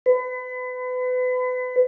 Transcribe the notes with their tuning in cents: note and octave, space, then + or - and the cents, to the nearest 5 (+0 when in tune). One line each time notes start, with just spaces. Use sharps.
B4 +35